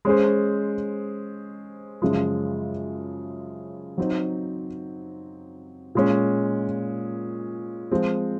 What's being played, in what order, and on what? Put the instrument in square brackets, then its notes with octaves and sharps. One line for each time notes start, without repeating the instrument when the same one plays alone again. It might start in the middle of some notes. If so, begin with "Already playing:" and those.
[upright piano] G#3 C#4 G#4 C5
F#2 C#3 F3 G#3
F#3 C4 D#4
A#2 G#3 C#4
F3 G#3 C4